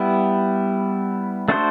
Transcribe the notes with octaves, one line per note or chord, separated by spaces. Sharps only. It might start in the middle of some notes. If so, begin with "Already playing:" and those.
Already playing: G3 B3 E4
A3 D4 F#4 A4 C5